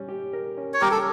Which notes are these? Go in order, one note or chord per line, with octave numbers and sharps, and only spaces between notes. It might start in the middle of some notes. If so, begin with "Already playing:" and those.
Already playing: G3 C#4
G4
A#4
C#4
C#5
G3 G4 A#4
A4